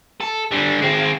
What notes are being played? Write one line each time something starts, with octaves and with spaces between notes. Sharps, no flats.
A4
D3 G3
G#3 C4